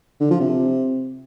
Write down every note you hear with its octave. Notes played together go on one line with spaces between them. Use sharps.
D3
F3
C3